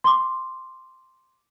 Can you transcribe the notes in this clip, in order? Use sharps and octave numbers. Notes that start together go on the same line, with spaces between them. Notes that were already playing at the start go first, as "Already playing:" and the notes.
C6 D6